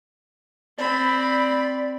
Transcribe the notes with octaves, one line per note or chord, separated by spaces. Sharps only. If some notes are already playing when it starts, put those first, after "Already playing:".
C4 D5 B5